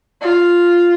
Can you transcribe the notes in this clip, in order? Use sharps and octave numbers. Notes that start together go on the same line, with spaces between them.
F4